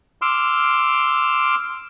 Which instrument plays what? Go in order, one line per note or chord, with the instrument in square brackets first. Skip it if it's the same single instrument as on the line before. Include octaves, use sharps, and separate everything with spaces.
[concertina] C6 D6 E6 F6